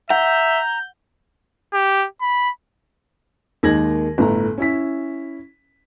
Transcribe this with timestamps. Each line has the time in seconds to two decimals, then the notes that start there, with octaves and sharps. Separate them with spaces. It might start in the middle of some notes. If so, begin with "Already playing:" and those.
0.10 E5 F#5 A#5 G6
1.73 G4
2.21 B5
3.63 D#2 D#3 G#3 G#6 A#6 F#7
4.18 G1 A2 A#5
4.58 C#4 E4 B6